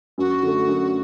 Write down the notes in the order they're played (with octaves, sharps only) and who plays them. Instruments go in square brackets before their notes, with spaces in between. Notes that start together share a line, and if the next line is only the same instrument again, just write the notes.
[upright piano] F#2 [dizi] F#4
[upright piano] D3 A3
F#2